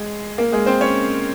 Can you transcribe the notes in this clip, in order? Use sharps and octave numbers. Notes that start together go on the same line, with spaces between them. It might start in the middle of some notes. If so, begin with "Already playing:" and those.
Already playing: G#3 G#4
A#3 A#4
G#3 G#4
C4 C5
C#4 C#5